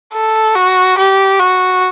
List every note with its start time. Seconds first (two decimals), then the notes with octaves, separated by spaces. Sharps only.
0.14 A4
0.56 F#4
0.98 G4
1.39 F#4